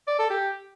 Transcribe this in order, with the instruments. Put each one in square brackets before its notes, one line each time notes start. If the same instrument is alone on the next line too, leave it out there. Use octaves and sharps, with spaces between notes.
[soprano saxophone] D5
A4
G4